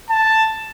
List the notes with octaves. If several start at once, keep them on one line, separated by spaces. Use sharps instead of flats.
A5